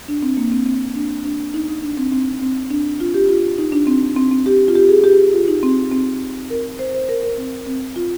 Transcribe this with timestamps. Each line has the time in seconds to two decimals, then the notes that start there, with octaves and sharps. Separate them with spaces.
0.08 D4
0.23 C4
0.37 A#3
0.52 C4
0.66 C4
0.95 D4
1.25 D4
1.54 D#4
1.68 D#4
1.83 D4
1.97 C4
2.12 C4
2.42 C4
2.70 D4
3.00 F4
3.14 G4
3.29 F4
3.58 D#4
3.72 D4
3.87 C4
4.17 C4
4.31 C4
4.46 G4
4.68 F4
4.75 G4
4.89 G#4
5.04 G4
5.33 F4
5.48 D#4
5.63 C4
5.92 C4
6.50 A#4
6.79 C5
6.95 C5
7.09 A#4
7.23 A#4
7.38 C4
7.67 C4
7.96 F4